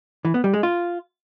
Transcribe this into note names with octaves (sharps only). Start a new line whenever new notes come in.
E3
B3
G3
G#3
F4